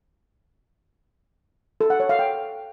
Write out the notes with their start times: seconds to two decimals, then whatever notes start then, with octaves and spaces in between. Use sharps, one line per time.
1.81 A4
1.90 F#5
2.00 C#5
2.09 F5
2.19 G5